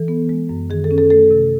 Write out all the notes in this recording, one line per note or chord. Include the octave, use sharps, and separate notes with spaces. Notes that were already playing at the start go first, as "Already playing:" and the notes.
Already playing: E3 A4
B3
G#3
F#2
D#3 G#4
A4
C#4
A4
A3 A4
C3